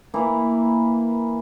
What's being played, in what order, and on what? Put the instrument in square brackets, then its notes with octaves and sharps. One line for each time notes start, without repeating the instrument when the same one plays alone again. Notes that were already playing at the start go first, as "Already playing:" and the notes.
[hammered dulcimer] E3 A#3 E4